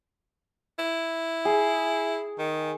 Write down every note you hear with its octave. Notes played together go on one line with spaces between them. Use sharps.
E4
G#4
D#3